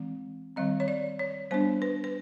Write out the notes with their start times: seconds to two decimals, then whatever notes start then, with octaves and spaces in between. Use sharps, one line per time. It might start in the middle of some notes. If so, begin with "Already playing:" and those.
Already playing: E3 G#3 C4
0.56 D#3 G3 C4 D#5
0.80 C#5
0.88 D5
1.19 C#5
1.51 G3 B3 D4 C5
1.82 B4
2.04 B4